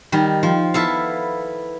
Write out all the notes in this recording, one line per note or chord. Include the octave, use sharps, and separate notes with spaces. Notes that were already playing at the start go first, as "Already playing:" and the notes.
D#3 G3
F3
B3 E4 A4 F5